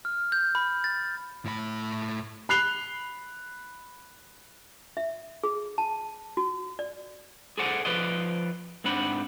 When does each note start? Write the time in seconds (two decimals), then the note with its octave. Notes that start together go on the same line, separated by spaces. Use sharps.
0.05 F6
0.32 G6
0.55 B5
0.84 A6
1.45 A2 B5
2.49 B5 F#6 C7 F7 G7
4.97 E5
5.44 G#4
5.78 A5
6.37 F#4
6.79 D5
7.58 G#4 A4 C5 D5 F#5 G#5
7.85 F3 B4 C5 D5 D#5
8.84 G#2 C4 D4 F#5 B5